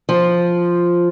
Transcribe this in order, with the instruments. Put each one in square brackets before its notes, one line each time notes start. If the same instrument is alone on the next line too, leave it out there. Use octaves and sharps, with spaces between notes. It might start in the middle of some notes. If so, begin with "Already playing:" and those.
[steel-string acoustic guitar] F3